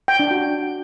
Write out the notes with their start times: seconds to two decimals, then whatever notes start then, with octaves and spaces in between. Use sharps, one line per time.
0.08 G5
0.20 D4
0.31 F#4